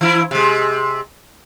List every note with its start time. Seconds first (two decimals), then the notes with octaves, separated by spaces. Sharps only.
0.01 E3 E4
0.31 C3 G#3